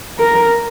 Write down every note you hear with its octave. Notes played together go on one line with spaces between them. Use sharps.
A#4